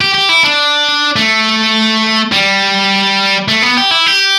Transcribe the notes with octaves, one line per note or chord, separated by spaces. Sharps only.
G4
G4
E4
D4
A3
G3
A3
B3
G4
E4
G4